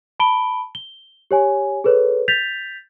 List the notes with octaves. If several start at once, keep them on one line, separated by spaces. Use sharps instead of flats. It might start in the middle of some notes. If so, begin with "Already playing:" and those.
A5 B5 D7 G7
G7
G4 C#5 G#5
G#4 A4 B4 C#5
G6 A6 B6 F7